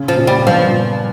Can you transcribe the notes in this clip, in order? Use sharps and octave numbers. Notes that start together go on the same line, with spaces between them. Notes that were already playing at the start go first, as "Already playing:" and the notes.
Already playing: C#3
F3
A#2
G3
G2 F3